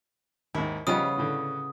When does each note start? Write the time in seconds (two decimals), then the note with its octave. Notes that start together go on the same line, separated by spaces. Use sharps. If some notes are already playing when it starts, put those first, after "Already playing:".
0.55 D#2 G#2 E4
0.87 C#3 F3 G3 B3 D#4 D#6
1.18 A2 D3